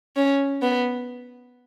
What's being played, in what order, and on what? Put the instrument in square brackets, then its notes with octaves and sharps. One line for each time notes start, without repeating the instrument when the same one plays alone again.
[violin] C#4
B3